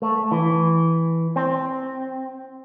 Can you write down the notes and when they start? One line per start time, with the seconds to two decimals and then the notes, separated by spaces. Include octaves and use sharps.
0.02 A3
0.32 E3
1.36 C4